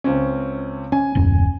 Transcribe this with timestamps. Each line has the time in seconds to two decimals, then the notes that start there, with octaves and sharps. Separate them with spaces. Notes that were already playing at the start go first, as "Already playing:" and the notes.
0.04 C#2 C4 C#4
0.92 C#4 G#5
1.15 D#1 F#2 C#4